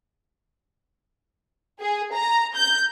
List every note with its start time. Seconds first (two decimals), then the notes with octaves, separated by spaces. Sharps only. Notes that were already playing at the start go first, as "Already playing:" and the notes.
1.80 G#4
2.14 A#5
2.55 G6